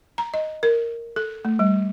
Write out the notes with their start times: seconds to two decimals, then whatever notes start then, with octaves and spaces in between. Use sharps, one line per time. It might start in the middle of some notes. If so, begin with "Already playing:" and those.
0.18 A#5
0.34 D#5
0.63 A#4
1.16 A4
1.45 A3
1.59 G3